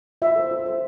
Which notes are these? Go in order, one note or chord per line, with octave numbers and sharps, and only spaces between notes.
F4 E5
A4 C5
F4
A4 C5